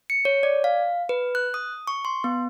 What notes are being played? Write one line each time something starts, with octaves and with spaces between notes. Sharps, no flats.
C#7
C#5
D5
F5
B4
F#6
D#6
C#6
C6
B3